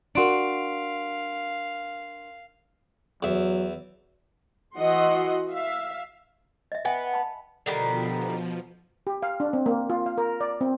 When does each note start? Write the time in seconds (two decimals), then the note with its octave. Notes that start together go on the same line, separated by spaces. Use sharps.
0.15 D4 F#4 A#4 F5 C6 D7
3.23 E2 F#3 E5
4.75 E3 F#4 D#5 F#5 C6
5.52 E5 F5
6.72 D#5 E5
6.85 B3 E5 G5 G#5
7.14 A5 B5
7.66 B2 D3 D#3 F3 G3
9.07 G4
9.23 F5
9.40 D4
9.53 C4
9.66 A#3
9.90 F4
10.06 F5
10.18 A#4
10.41 D5
10.61 C4